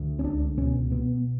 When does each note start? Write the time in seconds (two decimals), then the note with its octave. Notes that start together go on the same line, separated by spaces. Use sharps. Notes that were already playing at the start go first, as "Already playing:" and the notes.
Already playing: D2
0.19 C#4
0.24 C#2 D4
0.57 B2 C#4
0.91 B2 B3